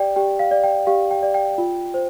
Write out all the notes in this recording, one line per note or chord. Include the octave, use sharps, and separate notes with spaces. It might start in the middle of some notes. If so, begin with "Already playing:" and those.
Already playing: G4 D5 G5
G4 G5
F5
D5
G5
G4 F5
G5
D5
G5
F4
C5